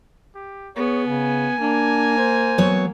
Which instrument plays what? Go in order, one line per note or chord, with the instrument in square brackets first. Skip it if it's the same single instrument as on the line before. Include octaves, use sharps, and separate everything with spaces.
[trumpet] G4
[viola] B3 [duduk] G#4 [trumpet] C#5
[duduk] C#3 [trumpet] G#5
[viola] A#3 [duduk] D4
[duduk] C5
[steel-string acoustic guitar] F#3 B3 C#5